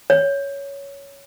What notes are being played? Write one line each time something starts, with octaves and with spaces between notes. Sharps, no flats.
C#5